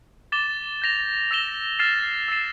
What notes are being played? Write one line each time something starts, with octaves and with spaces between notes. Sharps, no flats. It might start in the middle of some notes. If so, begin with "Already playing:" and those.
D6 A6 E7 G7
G6 A#6 F7
E6 A#6 E7 G7
F6 A6 C7 E7
E6 A6 C7 E7